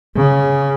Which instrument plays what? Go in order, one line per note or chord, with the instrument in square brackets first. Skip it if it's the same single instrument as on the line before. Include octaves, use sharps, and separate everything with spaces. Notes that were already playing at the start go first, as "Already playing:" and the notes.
[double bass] C#3